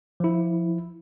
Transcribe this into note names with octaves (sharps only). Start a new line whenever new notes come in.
F3 E4